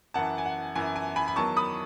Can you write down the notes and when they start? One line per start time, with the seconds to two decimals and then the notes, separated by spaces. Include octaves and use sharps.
0.14 F#2 E3 F#5 A5
0.38 G#5
0.46 F#5
0.75 F#2 E3 G#5
0.96 G#5
1.16 G#5 B5
1.28 B5
1.36 E2 D#3 F#3 A5 C#6
1.57 B5 D#6